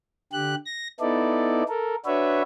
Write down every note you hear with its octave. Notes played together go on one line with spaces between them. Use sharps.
D3 G4 F#6
A#6
B3 D#4 E4 A4 D5
A4 A#4
D4 F#4 B4 C#5 E5